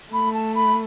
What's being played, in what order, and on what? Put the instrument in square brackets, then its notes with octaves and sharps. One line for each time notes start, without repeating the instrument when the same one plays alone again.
[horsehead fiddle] A3 [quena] B5
[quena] A5
B5